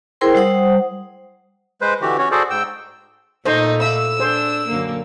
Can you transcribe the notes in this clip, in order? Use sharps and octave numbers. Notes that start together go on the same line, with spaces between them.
E4 G#4 A#4 C5 G5 C6
G3 C5 F#5 D#6
G#3 B4 C5
D3 E3 F#4 G4
C#4 F#4 C#5
F#4 G#4 A4 C5 D5
G#2 G5 E6
A#2 A3 D#4 A4 C5
E5 F5 B5 D6 E6
D4 G#4 C5
F#2 D3 A#3